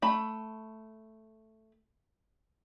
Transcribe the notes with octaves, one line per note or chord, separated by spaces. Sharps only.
A3 B5